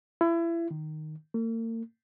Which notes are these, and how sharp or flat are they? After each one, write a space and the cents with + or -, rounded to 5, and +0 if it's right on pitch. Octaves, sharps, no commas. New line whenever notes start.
E4 +30
D#3 -10
A#3 -45